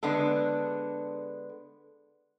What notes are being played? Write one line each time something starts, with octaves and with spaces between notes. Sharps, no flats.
D3 G#3 B3 D4 A4